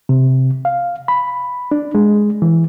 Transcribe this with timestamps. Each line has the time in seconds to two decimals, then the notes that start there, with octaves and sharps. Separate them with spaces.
0.09 C3
0.65 F5
1.08 B5
1.72 D4
1.95 G#3
2.42 E3